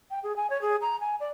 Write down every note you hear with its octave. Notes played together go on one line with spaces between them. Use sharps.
G5
G#4
G#5
C#5
G#4
A#5
G#5
D5